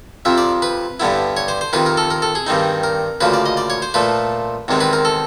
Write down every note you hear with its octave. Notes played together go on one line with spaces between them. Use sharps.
F2 C3 F3 E5
D5
B4
G2 D3 G3 B3 E4
C#5
C5
C5
F2 C3 D#3 B4
A#4
A4
A#4
A4
G#4
G2 D#3 G3 C4 D#4
A#4
D2 C#3 F3 A#3 B4
D5
D#5
D5
C#5
C5
A#2 F3 A3 B4
E2 C3 D#3 G#3 C4
B4
A#4
A4